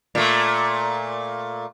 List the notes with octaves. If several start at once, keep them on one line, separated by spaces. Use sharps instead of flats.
A#2 A3